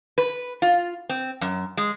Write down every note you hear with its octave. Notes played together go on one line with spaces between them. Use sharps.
B4
F4
C4
F#2
G#3